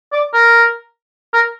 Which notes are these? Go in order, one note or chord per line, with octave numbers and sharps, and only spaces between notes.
D5
A#4
A#4